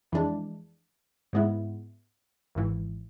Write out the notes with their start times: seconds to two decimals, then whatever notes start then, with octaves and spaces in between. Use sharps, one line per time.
0.12 F2 E3 G#3 D4
1.33 G#2 G#3 B3 E4
2.55 G#1 G#2 E3